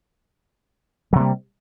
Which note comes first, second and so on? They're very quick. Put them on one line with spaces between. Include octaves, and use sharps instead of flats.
F#3 C3 A#3 G3